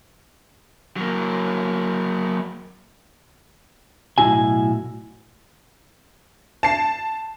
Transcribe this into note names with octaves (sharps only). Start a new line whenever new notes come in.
F#3 A#3
B1 A2 E4 F#4 G#5
A5 C7